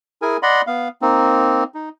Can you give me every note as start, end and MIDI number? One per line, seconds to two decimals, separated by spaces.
0.22 0.37 64
0.22 0.37 68
0.22 0.37 70
0.22 0.37 80
0.43 0.61 74
0.43 0.61 75
0.43 0.61 78
0.43 0.61 83
0.43 0.61 84
0.67 0.88 59
0.67 0.88 77
1.02 1.64 58
1.02 1.64 60
1.02 1.64 63
1.74 1.89 63